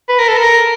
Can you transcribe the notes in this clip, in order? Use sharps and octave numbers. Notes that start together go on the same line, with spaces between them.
B4
A#4
A4
A#4